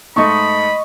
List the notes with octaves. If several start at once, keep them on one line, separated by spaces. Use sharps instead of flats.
G#2 A3 D#5 B5 C#6